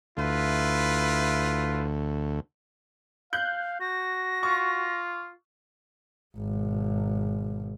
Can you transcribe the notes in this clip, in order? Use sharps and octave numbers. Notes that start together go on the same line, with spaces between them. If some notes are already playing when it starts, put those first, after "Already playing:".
D2 E4 F4 B4
F5 F#6 G6
F#4 A#6
F4 C#6
G#1 B2